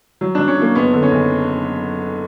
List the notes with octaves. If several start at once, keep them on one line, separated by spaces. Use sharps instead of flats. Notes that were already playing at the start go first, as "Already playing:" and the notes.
F#3
F#3 D4
C#4
F#3 A#3
F#1 B3
D3
C#4
F#1